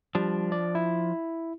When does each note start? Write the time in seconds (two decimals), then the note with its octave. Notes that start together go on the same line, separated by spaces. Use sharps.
0.15 F3 G3 D4
0.52 D5
0.75 E4